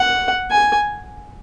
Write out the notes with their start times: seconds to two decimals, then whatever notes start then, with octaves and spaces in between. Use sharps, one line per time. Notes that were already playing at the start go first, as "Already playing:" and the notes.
Already playing: F#5
0.51 G#5